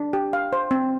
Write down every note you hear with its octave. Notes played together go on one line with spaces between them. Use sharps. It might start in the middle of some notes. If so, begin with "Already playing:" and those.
Already playing: D4
G4
F5
C5
C4